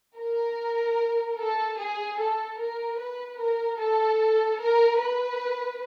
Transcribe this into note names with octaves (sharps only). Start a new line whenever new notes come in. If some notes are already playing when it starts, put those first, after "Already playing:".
A#4
A4
G#4
A4
A#4
B4
A#4
A4
A#4
B4